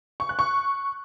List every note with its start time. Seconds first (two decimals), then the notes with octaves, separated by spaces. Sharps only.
0.20 C#6
0.29 F#6
0.39 C#6